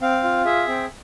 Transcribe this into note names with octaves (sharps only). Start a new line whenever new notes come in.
C4 F5
F4
G#4 E5
C4